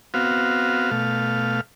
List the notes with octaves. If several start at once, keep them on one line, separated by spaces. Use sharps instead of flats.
B3 C4 F#4 F5
B2 A3 F5